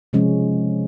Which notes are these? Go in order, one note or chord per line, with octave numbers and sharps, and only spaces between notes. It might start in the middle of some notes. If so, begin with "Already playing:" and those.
C3 F3 G#3 C#4